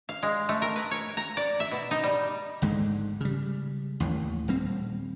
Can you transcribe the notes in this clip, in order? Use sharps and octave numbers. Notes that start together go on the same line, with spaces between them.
F5
G#3
A3
A#4
B4
C#5
A#5
D5
E5
B2
D#4
G3
G#1 G#2 D3 G#3
C#3 G3
A1 D#2
D#1 G3 C4